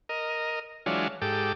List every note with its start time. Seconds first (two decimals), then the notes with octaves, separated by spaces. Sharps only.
0.09 A#4 D#5
0.86 E3 F#3 G#3 D4 F4 C#5
1.22 G#2 G4 A4 D6